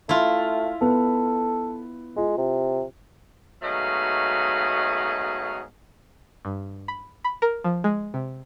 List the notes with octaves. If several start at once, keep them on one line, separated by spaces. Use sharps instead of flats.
A3 E4 F4
B3 A4
G#3 F4
C3
G#2 B2 F#3 A3 D#5 F5
G2
B5
B5
A#4
F3
G#3
C3